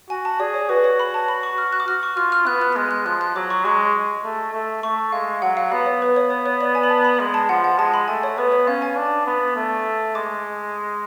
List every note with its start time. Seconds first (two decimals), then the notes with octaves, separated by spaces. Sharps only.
0.10 F#4 G#5
0.25 A5
0.40 G#4 D5
0.54 C#5
0.69 F#4 B4
0.84 C#5
1.00 B5
1.14 A5
1.28 B5
1.43 C#6
1.58 F6
1.73 F#6
1.80 D6
1.87 F#4 F6
2.03 C#6
2.17 F4 F6
2.32 F6
2.47 B3 F#6
2.61 F#6
2.72 F#6
2.76 G#3 F6
2.91 F#6
3.06 F3 F#6
3.21 F#6
3.35 F#3 D6
3.50 C#6
3.65 G#3 C#6
4.24 A3
4.53 A3
4.83 A3 C#6
5.12 G#3 F5
5.42 F#3 F#5
5.57 F5
5.72 B3 F5
5.86 C#5
6.02 B4
6.16 C#5
6.30 C#5
6.46 C#5
6.61 D5
6.75 G#5
6.83 B5
6.90 A5
7.05 B5
7.20 G#3 B5
7.34 A5
7.49 F3 F#5
7.64 F#5
7.79 G#3 A5
7.94 B5
8.08 A3 G#5
8.23 C#5
8.38 B3 B4
8.52 C#5
8.67 C#4 F5
8.82 G#5
8.96 D4
9.27 B3
9.56 A3
10.15 G#3 D6